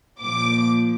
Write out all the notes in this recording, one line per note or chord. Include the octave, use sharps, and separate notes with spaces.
A#2 F3 D6